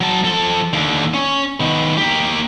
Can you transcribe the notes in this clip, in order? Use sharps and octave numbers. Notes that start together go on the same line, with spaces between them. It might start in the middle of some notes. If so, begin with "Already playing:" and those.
F#3 A5
F3 A4
D#2 D3
C#4
D#3 B3
A#3 G4